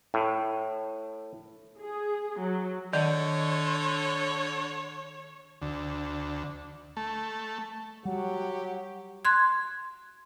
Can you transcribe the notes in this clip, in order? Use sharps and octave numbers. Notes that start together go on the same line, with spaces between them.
A2
G#4
F#3
D3 D#3 C#5 D5 F#5
D2
A3
F#3 G3 G4 F#5
C6 F#6 G#6